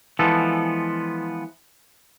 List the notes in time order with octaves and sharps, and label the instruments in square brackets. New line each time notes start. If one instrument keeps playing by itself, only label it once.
[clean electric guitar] E3 F3 G#3 B3 A4